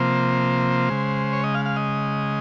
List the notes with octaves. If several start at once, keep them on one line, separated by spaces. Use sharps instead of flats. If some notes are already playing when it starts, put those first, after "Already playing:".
Already playing: C3 F3 A#3 C5
C#3 G#3
C#5
D#5
F5
F5
D#5